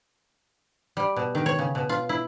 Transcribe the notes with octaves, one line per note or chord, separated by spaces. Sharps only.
G3
B2
D#3
C#5
C#3
B2
F4
E4